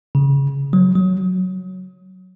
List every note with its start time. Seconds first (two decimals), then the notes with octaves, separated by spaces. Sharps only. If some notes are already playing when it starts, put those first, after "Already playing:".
0.15 C#3
0.73 F#3
0.95 F#3